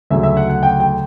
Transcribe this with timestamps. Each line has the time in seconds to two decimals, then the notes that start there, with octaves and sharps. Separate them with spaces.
0.10 D2 C#3 F#3 A3 C#4 E5
0.23 E5
0.37 F#5
0.50 F#5
0.63 G5
0.80 G5